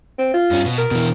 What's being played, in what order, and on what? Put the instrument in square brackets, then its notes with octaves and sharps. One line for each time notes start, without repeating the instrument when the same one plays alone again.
[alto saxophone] C4
F4
[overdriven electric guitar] G2 C#4
B2
[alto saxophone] A#4
[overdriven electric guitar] B2 E3